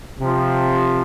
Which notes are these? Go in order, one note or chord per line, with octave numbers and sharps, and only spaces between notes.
C3 F3